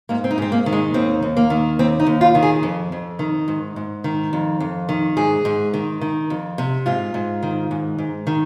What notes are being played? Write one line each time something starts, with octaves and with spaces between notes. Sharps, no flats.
G#2 A#3
C4
D#4
G#2 C4
A#3
D#3
G#3
D#2 C4
D#2
A#3
D#3
D#2 C4
D#4
D#2
F4
D#3
G#4
F2
F2
D#3
G#2
G#2
D#3
F2
F2
D#3
G#2 G#4
G#2
D#3
D#3
F2
C3
G#2 F4
G#2
D#3
G#2
G#2
D#3